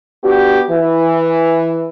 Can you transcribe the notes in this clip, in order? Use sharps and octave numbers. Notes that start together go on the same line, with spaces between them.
B3 D4 F#4 G4
E3